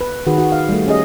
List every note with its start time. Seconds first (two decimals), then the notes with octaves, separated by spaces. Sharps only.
0.01 B4
0.27 D#3 F#4 G#4 B4
0.38 F#4
0.52 F5
0.69 G3 A3
0.87 C#4 G#4 D#5